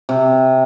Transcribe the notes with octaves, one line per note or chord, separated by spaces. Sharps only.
C3